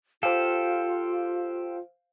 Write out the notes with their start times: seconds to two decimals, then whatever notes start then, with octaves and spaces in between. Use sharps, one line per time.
0.23 F4 G4 A4 C5 F5